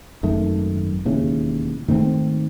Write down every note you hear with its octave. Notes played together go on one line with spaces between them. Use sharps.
G#1 F#2 D#3 A3
E1 D#2 C#3 E3
G#2 D#3 A3 C4